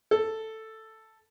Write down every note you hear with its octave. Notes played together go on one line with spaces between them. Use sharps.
A4